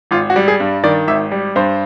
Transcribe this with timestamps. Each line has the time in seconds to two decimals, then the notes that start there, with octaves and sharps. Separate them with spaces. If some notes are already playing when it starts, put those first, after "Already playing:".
0.11 G#1 F4
0.30 F#4
0.36 G3
0.48 G#4
0.60 G2
0.84 D#3 D5
1.08 G#1 E5
1.31 G3
1.56 G2 C5